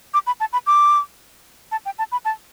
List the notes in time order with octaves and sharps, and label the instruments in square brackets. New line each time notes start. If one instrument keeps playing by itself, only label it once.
[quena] D6
B5
A5
B5
D6
A5
G5
A5
B5
A5